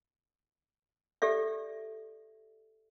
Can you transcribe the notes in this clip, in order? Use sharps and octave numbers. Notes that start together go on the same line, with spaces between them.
G4 A4 D5 E5